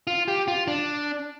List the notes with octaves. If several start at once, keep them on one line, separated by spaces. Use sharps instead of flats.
F4
G4
F4
D4